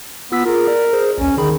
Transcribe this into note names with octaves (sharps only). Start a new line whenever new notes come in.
B3 F4 E6 B6
F4 G#4 A#4
D5
G#4 C5
A#1 D#2 C#4
D3 D#3 G#4 B5